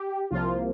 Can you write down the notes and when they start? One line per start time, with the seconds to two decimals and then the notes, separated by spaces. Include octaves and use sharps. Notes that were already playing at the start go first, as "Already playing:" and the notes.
Already playing: G4
0.31 C2 C3 F3 A#3 F4